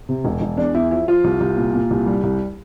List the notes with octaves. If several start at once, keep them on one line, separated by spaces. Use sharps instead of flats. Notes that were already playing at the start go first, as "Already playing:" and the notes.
C3
E1
E1
E2 D4
E2 E4
F3 E4
F3 F4
C2
C2
A#2
A#2
C2
G3
C2